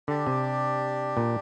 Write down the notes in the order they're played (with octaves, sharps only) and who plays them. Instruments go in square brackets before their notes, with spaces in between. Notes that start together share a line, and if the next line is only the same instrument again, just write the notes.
[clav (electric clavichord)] D3 [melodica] D4 G4 D5
[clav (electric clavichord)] C3
A#2